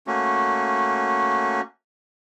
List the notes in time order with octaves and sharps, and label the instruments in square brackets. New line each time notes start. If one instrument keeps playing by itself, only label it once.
[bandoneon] A3 A#3 C#4 F#4